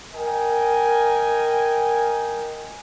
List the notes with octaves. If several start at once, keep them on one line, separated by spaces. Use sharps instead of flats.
A#4 D#5 G5 G#5